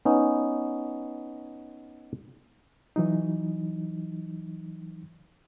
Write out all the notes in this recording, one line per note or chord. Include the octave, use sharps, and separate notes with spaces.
B3 C#4 D#4
E3 F#3 D#4